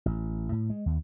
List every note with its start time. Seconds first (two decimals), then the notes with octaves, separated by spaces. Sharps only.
0.06 A1
0.52 A2
0.70 G#3
0.86 D#2